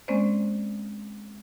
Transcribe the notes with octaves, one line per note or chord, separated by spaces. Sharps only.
G#3 A#3 C4 C#4 C5 D5